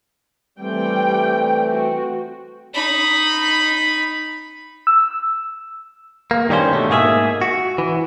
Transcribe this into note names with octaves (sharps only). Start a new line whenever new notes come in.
E3 G3 A3 C4 G5
F#4
D#4 B5
E6
A#3
G2 D#3 G3 C#4 C5
B2 A3
G#2 A#3 G#4 C5 E5
F#4
E3